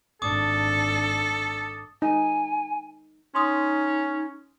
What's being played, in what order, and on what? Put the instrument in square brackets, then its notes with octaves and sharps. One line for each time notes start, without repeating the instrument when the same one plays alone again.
[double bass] G#1 D4 [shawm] A4 [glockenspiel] D6 D#6
[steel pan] D#4 [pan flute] G#5
[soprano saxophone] C#4 [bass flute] D#4 [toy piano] C6 D#6